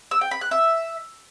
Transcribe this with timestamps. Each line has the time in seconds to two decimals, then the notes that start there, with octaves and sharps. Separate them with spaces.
0.11 E6
0.21 G5
0.31 B5
0.41 F#6
0.51 E5